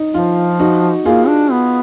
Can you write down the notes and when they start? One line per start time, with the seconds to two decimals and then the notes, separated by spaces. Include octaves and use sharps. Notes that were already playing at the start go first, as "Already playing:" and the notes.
Already playing: D#4
0.14 F3 F4
0.60 D#4 F#4
1.05 A#3 F4 G#4
1.28 D4
1.52 B3